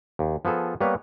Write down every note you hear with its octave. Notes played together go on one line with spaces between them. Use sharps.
D#2
F3 B3 G#4 A4
G3 A#3 B3 B4 C#5